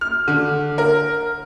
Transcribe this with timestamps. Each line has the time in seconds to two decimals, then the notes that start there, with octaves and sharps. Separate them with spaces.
0.01 F6
0.28 D3
0.78 A#4